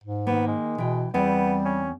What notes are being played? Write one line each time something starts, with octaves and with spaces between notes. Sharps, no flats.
G#2
D#3 A#3 B3
G#3
B2 E3 G5
E2 G3 B3 C4
C#4